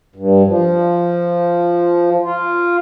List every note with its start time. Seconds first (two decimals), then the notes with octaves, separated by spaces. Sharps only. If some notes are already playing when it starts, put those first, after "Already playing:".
0.16 G2
0.46 F3
2.23 F4